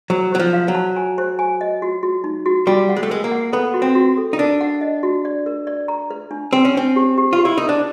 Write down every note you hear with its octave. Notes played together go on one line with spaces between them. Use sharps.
F#3 C5
F#3 C5
F3
F5
F#3
A5
G#5
C5
G#5
D#5
F#4
F#4
D#4
F#4
G3 F#4
F#5
G#3
A3
G#3 A#4
A#3
F#5
B3 A4
F#4
C4
F#4
A4
D#4
D4 A#4
F#5
D#5
F#4
D5
A#4
D5
A#5
B4
D4
C4 B4
C#4
C4 D4
G4
G4
F4
G4
E4
D#4 A#4
D4